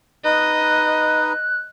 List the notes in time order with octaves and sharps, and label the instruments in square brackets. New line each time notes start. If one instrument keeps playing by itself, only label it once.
[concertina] D#4 B4 [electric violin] D#5 [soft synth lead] F#6